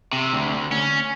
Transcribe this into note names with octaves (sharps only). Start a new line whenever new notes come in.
C3
D2
C#4